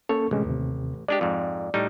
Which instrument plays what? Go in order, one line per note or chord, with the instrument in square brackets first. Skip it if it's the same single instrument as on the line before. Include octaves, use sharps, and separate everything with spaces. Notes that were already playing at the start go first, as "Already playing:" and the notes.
[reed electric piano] A#3 C#4 A4 [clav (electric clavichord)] C#5
[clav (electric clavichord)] A1 [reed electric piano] C3 G#3 C#4
[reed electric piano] D#2 C3
[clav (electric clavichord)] G#3 D4 G4 [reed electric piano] D5
[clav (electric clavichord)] F2 G#2
A2 G3 D#4